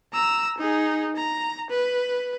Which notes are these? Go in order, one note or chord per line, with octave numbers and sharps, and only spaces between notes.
A#5 E6
D#4 G#4
A#5
B4